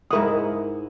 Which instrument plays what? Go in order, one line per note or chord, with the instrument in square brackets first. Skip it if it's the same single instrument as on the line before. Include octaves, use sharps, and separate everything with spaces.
[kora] G#2 E4 F#5 [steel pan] A#4 D#6